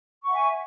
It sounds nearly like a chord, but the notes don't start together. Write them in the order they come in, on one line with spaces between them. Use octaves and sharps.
C#6 F#5 E5 G#5